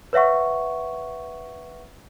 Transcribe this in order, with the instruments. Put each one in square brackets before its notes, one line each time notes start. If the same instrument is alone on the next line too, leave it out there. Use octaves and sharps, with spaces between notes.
[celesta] B4 C#5 E5 F#5 C#6